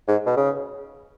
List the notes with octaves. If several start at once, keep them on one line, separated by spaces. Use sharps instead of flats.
G#2
B2
C#3